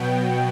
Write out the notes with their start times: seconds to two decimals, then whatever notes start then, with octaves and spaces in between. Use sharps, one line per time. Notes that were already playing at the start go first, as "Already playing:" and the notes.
Already playing: B2 F#3 B3 G5